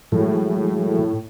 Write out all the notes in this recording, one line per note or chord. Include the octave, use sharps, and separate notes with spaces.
A2 E3 F#3 G#3